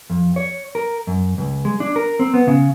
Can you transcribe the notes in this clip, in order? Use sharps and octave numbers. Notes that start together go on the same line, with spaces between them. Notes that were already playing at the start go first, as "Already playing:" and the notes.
F2
C#5
A#4
F#2
C#2
G#3
D4
A#4
C4
B3
C#3